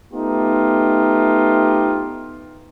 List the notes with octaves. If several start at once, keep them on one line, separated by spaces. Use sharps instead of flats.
A3 B3 D#4 F4 G4